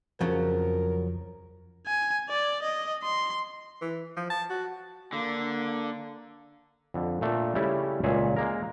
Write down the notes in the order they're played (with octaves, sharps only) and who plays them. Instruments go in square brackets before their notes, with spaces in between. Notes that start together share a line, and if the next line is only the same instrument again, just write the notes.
[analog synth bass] F2 [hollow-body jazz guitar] C#3 F3 F#3 [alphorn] A#4
[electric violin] G#5
D5
D#5
C6
[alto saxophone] E3
F3
A5
F#4
[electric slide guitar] D3 [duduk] A#3
[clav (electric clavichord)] F2 D3
A#2 A3 D4
C#3 G3 A3 C#4 E4 G4
C#2 A#2 G#4 C#5 E5
G#3 A#3 A#4